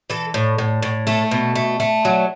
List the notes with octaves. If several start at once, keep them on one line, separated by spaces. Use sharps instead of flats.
E3 A4
A2
A2
A2
A3 A4
B2
A3
A3
F#3